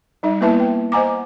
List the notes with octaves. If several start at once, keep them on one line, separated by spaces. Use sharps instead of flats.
G3 D#4 E5
A#3 B3 E4 B4 E5 A5
G5
C5 D#5 F#5 G#5 A#5 D6